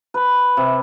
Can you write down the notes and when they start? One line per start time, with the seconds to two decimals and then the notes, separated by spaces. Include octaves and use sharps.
0.14 B4
0.57 C3